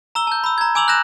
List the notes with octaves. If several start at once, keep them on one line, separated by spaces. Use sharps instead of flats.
A#5 E6 G7
A5 G6
B5 E6
A#5 G#6
G#5 D6 E6 F7 F#7
F#6 G6 A#6 E7